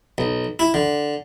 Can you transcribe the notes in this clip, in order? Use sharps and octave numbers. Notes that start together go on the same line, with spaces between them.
B1
E4
D3